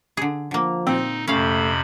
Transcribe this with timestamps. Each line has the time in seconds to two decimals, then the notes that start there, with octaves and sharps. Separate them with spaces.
0.17 D3 G#4
0.51 D3 F3 A#3
0.87 A#2 C4 D#4
1.27 F2 C3 A3 C#4 F5 B5